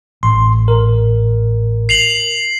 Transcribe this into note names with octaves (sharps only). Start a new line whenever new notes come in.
A1 C6
A#4
C7 F7 F#7